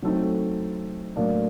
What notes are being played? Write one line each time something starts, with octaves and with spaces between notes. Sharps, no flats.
F#3 A3 C4 D#4
A2 F#3 A#3 D4